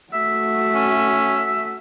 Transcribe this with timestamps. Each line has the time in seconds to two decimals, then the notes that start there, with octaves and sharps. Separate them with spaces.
0.13 A3 F#4 E5
0.75 C#4